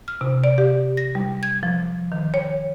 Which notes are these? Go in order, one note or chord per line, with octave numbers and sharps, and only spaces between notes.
F6
C3
D5
G4
A#6
G3
G#6
F3
D#3
C#5